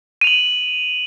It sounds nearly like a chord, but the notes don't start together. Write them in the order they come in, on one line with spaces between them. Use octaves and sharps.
D#7 F7 F#7